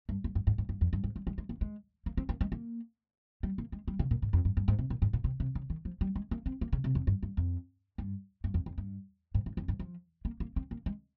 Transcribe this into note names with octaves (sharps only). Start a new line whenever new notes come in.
G2
G2
G2
G#2
G#2
G2
F2
G2
G#2
G3
G#3
G#3
A#3
G#3
A#3
C4
A#3
G#3
A#3
G3
A#3
G#3
G3
C#3
A#2
G#2
F2
G2
G2
G#2
C3
A#2
G#2
A#2
C3
C3
C#3
D#3
F3
G3
G#3
A#3
C4
A#3
C#3
C3
F2
G2
G2
F2
G2
G2
F2
F2
G2
G#2
G#2
F2
G2
F3
A#3
A#3
C4
A#3
G#3